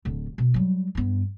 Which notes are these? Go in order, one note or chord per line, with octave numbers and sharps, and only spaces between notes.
D1 D3
B2
F#3 G3
G2 B3